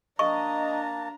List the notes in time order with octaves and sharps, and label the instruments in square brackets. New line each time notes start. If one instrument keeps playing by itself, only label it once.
[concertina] A#3 A5 [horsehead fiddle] D4 A#5 [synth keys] D#5 [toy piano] C#6